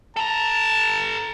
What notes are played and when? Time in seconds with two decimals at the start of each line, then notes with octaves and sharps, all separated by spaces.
0.17 A4 A5 A#5